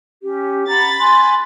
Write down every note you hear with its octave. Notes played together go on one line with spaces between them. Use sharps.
C#4 G4
F#5 A#5 B5 A6
G#5 C6 F#6